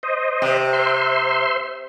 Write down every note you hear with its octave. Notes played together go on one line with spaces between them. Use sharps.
C5 D#5
C3
C5 E5 C6